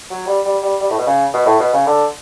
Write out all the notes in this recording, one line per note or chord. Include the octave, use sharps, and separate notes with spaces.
F#3
G3
G3
G3
G3
A2
B2
C#3
B2
A2
B2
C#3
D3